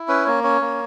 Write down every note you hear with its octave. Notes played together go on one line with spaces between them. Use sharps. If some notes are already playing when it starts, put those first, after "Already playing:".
Already playing: E4
C#4 B4
A#3 C#5
C#4 C#5
A#3